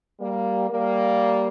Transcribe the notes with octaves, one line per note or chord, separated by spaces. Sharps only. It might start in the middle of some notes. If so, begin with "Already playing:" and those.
G3 A#3
G3 A#3